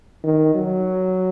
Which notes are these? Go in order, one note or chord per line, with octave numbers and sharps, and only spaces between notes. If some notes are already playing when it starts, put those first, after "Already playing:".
D#3
F#3